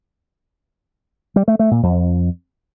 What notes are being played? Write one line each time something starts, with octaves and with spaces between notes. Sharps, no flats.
G3
A3
A3
A#2
F2